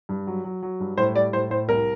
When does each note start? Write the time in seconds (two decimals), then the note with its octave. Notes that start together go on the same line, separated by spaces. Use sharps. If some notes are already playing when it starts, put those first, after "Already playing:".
0.09 G2
0.27 F#3
0.44 F#3
0.63 F#3
0.80 G2
0.98 A2 C5
1.15 G3 D5
1.33 A2 C5
1.50 A2 C5
1.68 C2 A#4